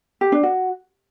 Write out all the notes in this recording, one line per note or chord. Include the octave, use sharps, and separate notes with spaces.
G4
D4
F#4